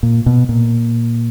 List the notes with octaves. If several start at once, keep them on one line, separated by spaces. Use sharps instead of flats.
A#2
B2
A#2